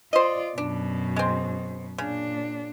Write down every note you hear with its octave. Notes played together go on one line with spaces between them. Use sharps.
F4 C5 D5 D#5
F#2 B2 D4
G#3 C4
A#2 C#3 D4